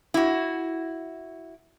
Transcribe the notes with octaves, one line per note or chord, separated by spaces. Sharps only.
E4 F#4